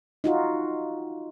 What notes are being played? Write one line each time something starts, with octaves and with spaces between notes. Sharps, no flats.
D#4 F4 F#4